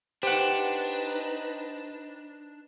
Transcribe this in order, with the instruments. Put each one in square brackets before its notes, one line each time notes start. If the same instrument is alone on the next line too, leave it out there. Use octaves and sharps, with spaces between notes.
[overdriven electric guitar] D4 [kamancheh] D#4 B4 [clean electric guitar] G4 F#5 [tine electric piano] C5